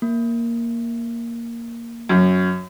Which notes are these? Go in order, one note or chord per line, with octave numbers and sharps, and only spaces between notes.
A#3
F#2